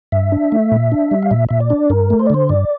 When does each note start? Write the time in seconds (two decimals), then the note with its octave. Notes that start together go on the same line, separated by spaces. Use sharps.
0.12 G2 E5
0.32 D4
0.52 A3
0.72 A#2
0.92 D4
1.11 G3
1.23 F5
1.31 A#2 E5
1.49 A#2 E5
1.60 D5
1.70 D4
1.90 G2 A#4
2.10 A3
2.19 C5
2.27 D5
2.30 D3 C5
2.49 G2 D5